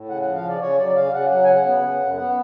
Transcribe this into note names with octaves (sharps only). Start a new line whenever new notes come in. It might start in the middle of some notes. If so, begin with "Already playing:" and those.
Already playing: A2
C#3 F#5
F3 F#5
F5
C#3 D5
C#3 C#5
F#3 D5
D5
C#3 F5
C#3 F#5
F#3 F#5
G#5
C#3 F#5
B3
C#3
F#2
B3 F#5